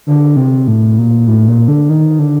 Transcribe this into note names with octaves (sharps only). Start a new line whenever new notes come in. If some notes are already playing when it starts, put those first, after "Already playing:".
D3
C3
A2
A#2
A2
A#2
D3
D#3
D3